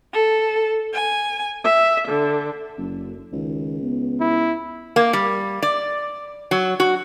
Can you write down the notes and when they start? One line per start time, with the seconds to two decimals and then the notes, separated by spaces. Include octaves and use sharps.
0.13 A4
0.93 G#5
1.65 E5
2.08 D3
2.78 F#1 F#2
3.33 C#2 D#3
3.83 B3
4.20 E4
4.96 A#3
5.13 G3
5.63 D5
6.51 F#3
6.80 F#4